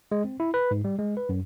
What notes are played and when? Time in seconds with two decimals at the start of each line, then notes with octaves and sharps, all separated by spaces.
0.12 G#3
0.24 C4
0.40 E4
0.54 B4
0.71 G#2
0.85 G3
0.99 G#3
1.17 B4
1.29 F#2